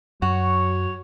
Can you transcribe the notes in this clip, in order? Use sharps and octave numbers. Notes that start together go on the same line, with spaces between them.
F#2 F#3 F#4 C#5